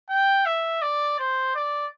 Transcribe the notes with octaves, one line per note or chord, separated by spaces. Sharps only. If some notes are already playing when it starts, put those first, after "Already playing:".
G5
E5
D5
C5
D5